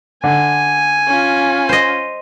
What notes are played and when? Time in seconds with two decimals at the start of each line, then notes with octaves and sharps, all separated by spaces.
0.24 D3 G#5
1.07 C#4 F4
1.69 C5 D#5